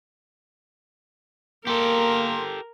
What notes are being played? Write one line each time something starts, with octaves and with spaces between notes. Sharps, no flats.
A#3 G4 A4 A#4 C6